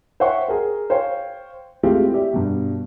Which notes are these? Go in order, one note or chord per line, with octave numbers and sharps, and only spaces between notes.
C5 C#5 E5 F#5 G5 C#6
G#4 A#4
C5 C#5 F5 G5
G#3 A3 C4 E4 F4 G4
G4 D5 E5
G2 B2